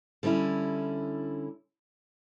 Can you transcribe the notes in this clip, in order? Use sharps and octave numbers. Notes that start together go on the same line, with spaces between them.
D3 G3 C#4 E4